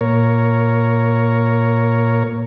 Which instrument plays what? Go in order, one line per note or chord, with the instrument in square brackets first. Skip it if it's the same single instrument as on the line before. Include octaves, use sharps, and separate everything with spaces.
[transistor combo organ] A#2 A#4 C#5